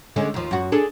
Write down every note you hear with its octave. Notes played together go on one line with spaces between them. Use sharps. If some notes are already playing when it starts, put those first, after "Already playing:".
D3 G#3 C#4
D#2 F3
F#2 F#4
D4 G#4 A4